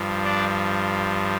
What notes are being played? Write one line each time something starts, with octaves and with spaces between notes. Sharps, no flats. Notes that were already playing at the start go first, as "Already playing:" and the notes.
Already playing: G2 F3
D4 D5